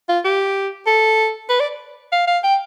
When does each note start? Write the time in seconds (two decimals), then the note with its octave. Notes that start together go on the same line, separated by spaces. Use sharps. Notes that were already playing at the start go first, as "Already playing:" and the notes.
0.09 F4
0.25 G4
0.87 A4
1.49 B4
1.60 D5
2.12 F5
2.27 F5
2.44 G5